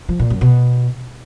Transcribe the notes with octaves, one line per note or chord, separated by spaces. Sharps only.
F3
A#2
F#2
B2